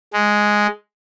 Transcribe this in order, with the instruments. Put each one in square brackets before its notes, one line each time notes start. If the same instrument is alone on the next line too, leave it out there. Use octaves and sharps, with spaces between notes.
[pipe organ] G#3